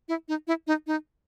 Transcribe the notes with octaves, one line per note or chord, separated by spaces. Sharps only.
E4
D#4
E4
D#4
D#4